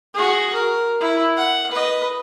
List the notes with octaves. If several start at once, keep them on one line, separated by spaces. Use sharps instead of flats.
F#4 G#4
A#4
E4
F#5
B4 D#5